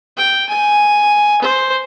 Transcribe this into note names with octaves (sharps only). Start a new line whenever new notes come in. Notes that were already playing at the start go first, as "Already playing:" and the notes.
G5
G#5
C5